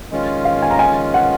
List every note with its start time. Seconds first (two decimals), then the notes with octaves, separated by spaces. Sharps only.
0.11 D#3 G#3 C#4 F4
0.45 F5
0.62 G#5
0.70 A#5
0.79 G#5
1.14 F#5